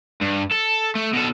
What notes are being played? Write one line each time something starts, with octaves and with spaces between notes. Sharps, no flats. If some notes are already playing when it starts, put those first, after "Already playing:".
G2
A4
A3
B2 A4